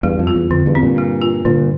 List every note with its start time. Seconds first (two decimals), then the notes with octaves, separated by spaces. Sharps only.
0.03 E2 G2 G3
0.19 F2
0.27 F4
0.35 E2
0.51 F2 D3
0.66 E2 G2
0.75 C4
0.82 G2 A#2
0.98 G3
1.22 F4
1.45 G2 A#2 D3